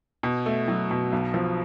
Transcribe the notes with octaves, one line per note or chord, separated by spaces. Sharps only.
B2
A3
F#3
B2
B1
F3